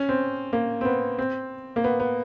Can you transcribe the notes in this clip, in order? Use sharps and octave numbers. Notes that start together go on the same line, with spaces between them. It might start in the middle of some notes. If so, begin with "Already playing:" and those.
Already playing: C#4
C4
A#3
C4
B3
C4
A#3
B3
B3